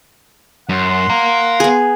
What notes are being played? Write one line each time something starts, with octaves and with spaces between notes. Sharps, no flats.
F#2 F#5 C6
F5 A#5
B3 G#4